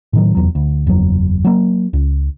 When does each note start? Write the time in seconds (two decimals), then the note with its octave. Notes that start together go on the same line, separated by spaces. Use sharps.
0.13 A2 D#3 F#3
0.35 F1 E2 F#3
0.55 D2
0.87 F#1 E2 F#3
1.45 F#3 A#3
1.93 C#2